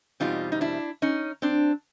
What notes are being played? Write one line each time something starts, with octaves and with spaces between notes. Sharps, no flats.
E2 B2 G3 C4 D#4 F4
D#4
D4 E4
C#4 D#4
C4 D4